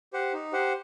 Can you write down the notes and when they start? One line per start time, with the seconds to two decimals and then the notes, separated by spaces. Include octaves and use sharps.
0.13 G4 C5 F#5
0.33 D#4
0.53 G4 C5 F#5